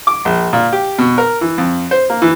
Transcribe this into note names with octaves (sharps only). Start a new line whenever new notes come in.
D6
A#1
A#2
G4
B2
A#4
E3
F2
C5
A#3
E3